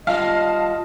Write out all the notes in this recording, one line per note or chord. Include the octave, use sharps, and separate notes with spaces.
G3 F4 D#5 F5 A5